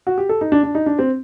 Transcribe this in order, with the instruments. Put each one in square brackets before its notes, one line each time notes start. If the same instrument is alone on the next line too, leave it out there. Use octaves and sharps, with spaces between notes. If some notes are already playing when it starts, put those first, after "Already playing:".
[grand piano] F#4
G4
A4
D#4
D4
D4
D#4
D4
C4